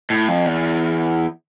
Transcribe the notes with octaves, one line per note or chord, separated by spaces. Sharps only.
A2
F2
E2